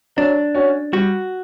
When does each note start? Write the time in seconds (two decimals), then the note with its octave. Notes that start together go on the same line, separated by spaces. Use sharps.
0.17 F#3 D4
0.55 C#4 F#4 C#5
0.93 G3 F#4